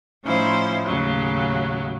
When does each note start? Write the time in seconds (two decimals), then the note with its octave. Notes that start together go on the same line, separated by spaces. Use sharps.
0.23 A2 F3 C#4 D#4 E4 C5
0.86 D#2 A2 C#3 F#3